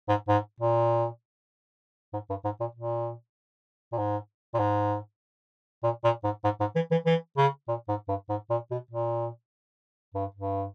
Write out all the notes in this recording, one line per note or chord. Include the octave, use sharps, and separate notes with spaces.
G#2
G#2
A#2
G#2
G2
G#2
A#2
A#2
A#2
G#2
A#2
G#2
A#2
A#2
G#2
G#2
G#2
E3
E3
E3
C#3
A#2
G#2
G2
G#2
A#2
B2
A#2
G2
G2